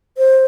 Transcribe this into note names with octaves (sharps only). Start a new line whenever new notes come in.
C5